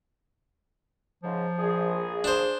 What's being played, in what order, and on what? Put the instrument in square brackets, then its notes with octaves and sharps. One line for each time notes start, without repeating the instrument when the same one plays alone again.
[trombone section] G#2 C#3 [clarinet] F3
[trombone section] A#1 [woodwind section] G#4
[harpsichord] D4 C5